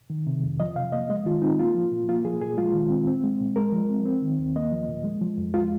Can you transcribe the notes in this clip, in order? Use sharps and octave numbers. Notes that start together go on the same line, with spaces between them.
D#3
C3
F2
F3 D#5
C3 F5
A#3 D#5
G#3 D#5
D#3 F4
C4 D#4
A#3 F4
F3
A#2
A#3 F4
F3 G#4
A#2 G#4
G#3 F4
D#3
C4
C4
G#3
A#2
G#3 A#4
F3
C4
C4
D#3
D#2
A#3 D#5
F3
A#2
G#3
F3
F2
G#3 F4